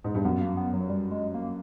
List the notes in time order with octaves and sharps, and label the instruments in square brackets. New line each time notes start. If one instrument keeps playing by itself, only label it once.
[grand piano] G#2
G2
[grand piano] F#2 [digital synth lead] B3
[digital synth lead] A#3
B3
F#3
G3
G#3
A#3